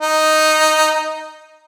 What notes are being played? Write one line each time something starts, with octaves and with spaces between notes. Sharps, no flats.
D#4